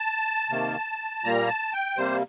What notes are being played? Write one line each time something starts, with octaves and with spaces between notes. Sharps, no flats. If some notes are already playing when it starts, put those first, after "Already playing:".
Already playing: A5
C3 D#3 A#3
A#2 G3 A#3 A#5
A5
G5
C3 G3 A#3 C5